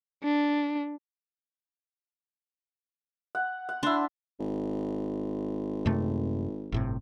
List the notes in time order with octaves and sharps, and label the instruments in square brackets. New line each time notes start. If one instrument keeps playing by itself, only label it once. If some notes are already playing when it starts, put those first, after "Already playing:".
[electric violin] D4
[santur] F#5
F#5
[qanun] D4 [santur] E4 C6
[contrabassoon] G#1
[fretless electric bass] F#2 C3 A3
G1 A2 C3